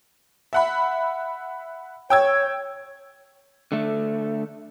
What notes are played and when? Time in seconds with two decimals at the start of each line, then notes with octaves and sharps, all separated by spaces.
0.53 E5 F#5 B5
2.10 C#5 G5 E6 G#6
3.72 D3 A3